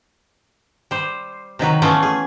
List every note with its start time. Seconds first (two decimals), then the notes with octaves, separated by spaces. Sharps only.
0.91 G3 C5
1.59 C3 D#3 F#3 B4
1.82 E3 A3 B3 C#4 F4
2.03 G#4